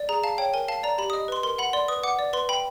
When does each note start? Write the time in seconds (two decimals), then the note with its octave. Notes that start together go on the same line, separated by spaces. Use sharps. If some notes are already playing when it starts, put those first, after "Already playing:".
Already playing: D5
0.09 G#4 A#5
0.24 F5 A5
0.38 C#5 G5
0.54 A#4 G#5
0.68 F5 A5
0.83 D5 A#5
0.98 G4 B5
1.10 D#6
1.13 D#5
1.28 B4 C6
1.43 A#4 C6
1.58 F#5 B5
1.73 D5 C6
1.88 B4 D#6
2.03 F#5 D6
2.19 D5
2.33 B4 C6
2.49 G5 B5